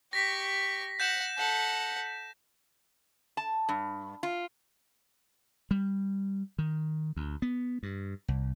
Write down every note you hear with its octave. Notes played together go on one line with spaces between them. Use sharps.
G4 C#6 A#6 B6
F#5 G6 A#6 E7
A4 F#5
A5
G2
F4
G3
D#3
D2
B3
G2
C2